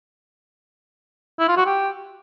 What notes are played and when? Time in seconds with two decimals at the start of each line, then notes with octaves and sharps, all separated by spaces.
1.39 E4
1.48 F4
1.57 F#4
1.66 G4